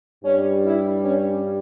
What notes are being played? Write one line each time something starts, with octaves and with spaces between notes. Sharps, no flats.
G2 G3 C#4
E4
C#4